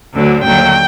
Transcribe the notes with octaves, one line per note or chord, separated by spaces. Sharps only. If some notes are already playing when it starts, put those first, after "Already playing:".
D2 D3 F#3
D#2 D3 F#3 G5